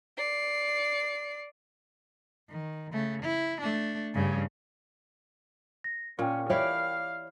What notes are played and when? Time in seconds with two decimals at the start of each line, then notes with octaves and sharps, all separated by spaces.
0.18 D5 C7
2.50 D#3
2.93 C#3 A3
3.23 E4
3.61 A3 D4
4.14 G2 C#3
5.84 A#6
6.19 A#2 C#4 A#4 G5
6.50 E3 E4 G4 C#5 D5 F5